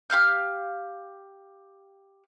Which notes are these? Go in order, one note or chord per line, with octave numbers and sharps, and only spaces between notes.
G4 F5 F6 G6